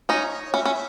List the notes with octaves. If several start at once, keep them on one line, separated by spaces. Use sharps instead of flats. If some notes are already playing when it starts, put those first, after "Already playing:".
C#4 D#4 C#5
C#4 E5
C#4